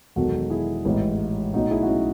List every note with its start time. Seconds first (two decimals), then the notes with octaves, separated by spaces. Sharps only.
0.16 E1 E2 D#3 F#3 F#4 A4
0.50 E4 G#4
0.85 A1 G#2 E3
1.53 B1 A2 F#3 D#4 F#4
1.71 E4 G#4
1.83 F#4
1.88 C#4 E4